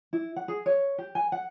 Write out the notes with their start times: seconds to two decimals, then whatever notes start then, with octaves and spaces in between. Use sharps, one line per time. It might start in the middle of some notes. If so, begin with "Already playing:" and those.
0.13 E4
0.36 F#5
0.48 G#4
0.66 C#5
0.98 G4
1.15 G#5
1.32 F#5